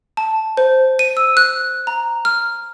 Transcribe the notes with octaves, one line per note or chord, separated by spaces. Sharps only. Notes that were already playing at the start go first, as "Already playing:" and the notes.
A5
C5
D#7
E6
F#6
A#5
F6